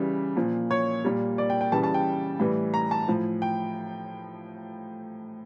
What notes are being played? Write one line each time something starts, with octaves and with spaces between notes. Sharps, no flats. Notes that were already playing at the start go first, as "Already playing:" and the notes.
Already playing: C#3 E3 G3
A#2 F3
C#5
A#2 G3
D5
G5
G5
C#3 E3 G3 A5
A5
G5
A2 E3 G3
A#5
A5
A2 F3
G5